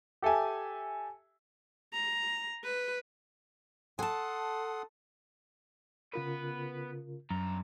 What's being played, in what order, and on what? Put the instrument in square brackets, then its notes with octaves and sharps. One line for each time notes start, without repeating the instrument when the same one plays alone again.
[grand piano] G4 A4 E5 G#5
[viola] A#5
B4
[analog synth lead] A4 [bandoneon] F#5 C6 D#6 [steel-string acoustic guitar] G#5 A5
[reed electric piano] C#3 F4 A#4 [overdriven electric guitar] B3 B4
[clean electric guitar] F#2 [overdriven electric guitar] D3 A#5